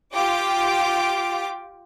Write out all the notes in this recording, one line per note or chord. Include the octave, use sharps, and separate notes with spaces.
F4 G4 G5 D6